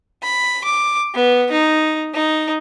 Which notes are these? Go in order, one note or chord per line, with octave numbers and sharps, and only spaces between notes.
B5
D6
B3
D#4
D#4